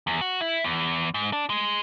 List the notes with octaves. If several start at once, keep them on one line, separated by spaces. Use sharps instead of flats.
E2
F#4
E4
E2
G#2
D4
G#3